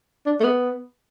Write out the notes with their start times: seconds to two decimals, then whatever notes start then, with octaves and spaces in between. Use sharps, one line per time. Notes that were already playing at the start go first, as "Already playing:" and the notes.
0.26 D4
0.40 A3
0.44 B3